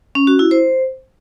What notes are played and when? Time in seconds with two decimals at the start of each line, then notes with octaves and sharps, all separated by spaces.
0.15 C#4
0.27 F#4
0.39 E4
0.51 C5